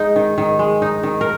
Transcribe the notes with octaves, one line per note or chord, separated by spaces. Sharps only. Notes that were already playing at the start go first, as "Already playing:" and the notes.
Already playing: G#3 D#4
D#3
D#3
G#3
D#4
D#3
A#4